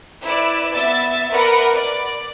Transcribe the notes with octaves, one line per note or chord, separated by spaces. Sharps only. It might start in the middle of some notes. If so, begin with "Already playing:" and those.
E4 B4 D5 E6
B3 E5 E6 A6
A#4 B4 D5 F#5
D5